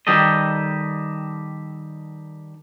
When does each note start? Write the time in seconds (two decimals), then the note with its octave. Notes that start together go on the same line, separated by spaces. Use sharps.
0.07 D#3 G3 G4 A4 D#5